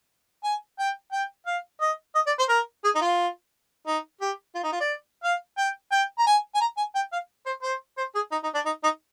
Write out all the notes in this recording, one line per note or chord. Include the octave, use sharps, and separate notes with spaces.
G#5
G5
G5
F5
D#5
D#5
D5
C5
A#4
G#4
D#4
F4
D#4
G4
F4
D#4
F4
D5
F5
G5
G5
A#5
G#5
G#5
A#5
G#5
G5
F5
C5
C5
C5
G#4
D#4
D#4
D4
D#4
D#4